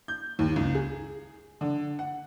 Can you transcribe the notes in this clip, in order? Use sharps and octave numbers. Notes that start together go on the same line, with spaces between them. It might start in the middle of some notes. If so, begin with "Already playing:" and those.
G6
D#2
C#2
G#4
D3
F#5